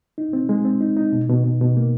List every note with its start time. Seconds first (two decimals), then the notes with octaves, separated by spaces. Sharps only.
0.18 D#4
0.33 C4
0.49 G#3
0.65 C4
0.81 D#4
0.97 D#4
1.12 B2
1.29 B2
1.44 B2
1.61 B2
1.77 A#3